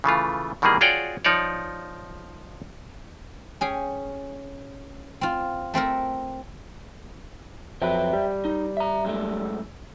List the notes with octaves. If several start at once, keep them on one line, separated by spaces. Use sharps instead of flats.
C#3 E3 A3 F4
B2 D#3 E3 G3 A#3 G#4
F4 F#4 G#4 C#5 D5 G5
F3 D#4 C#5 D5
C#4 G#4 G5
C4 F4
A3 C4 A4 A#4
F2 F#3 B4 C5 E5 G5
G3
D#4
E5 A#5
F#2 G#3 A3